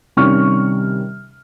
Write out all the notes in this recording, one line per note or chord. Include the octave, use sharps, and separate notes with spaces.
C3 D#3 G3 C#4 C#6 F6